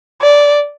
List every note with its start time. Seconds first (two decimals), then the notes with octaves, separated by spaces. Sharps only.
0.22 D5